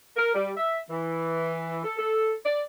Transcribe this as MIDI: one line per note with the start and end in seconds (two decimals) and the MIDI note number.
0.16 0.31 70
0.35 0.53 55
0.57 0.79 76
0.89 1.83 52
1.84 1.95 69
1.99 2.34 69
2.45 2.60 74